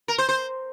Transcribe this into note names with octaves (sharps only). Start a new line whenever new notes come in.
A#4
C5
C5